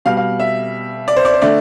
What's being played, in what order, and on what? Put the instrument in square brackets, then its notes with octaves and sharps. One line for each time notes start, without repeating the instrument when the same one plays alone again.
[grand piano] B2 G3 F5
F5
E5
D5
C5
D5
C5
D3 A3 D5